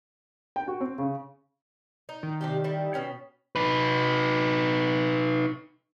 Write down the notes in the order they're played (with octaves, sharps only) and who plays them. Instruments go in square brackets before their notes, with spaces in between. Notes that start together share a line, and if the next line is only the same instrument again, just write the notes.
[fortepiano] G5
F#4
C4
C#3
[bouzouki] D#4
[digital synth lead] D#3
[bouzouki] C3 D4 G4
G3 E4 A4
B2 C#4 G5
[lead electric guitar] D#4 B4